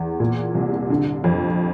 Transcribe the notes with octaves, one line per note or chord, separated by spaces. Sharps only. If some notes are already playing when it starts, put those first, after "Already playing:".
Already playing: E2
A#2
C2
D3
F2